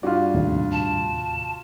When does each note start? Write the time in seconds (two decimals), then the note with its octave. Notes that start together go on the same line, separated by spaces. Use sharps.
0.03 G2 F4 F#4 D5
0.34 D#2 A2 C3
0.72 A5